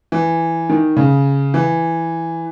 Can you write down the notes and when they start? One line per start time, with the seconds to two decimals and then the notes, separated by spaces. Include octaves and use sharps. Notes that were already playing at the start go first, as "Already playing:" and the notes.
0.12 E3
0.69 D#3
0.97 C#3
1.54 E3